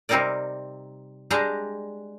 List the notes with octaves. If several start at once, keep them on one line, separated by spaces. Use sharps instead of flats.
C3 G3 C4 D#4 A#4 D5
G3 G#3 D4 G4 G#4 A#5